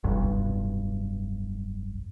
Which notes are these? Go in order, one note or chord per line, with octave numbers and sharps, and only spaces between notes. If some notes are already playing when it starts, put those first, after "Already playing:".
F1 B1 G2